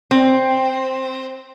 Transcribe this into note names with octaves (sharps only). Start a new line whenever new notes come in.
C4